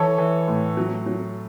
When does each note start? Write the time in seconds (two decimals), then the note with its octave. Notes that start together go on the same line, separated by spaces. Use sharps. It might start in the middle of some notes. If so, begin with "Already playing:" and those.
Already playing: E3 A4 C#5
0.18 E3
0.48 A2
0.77 F#3
1.06 F#3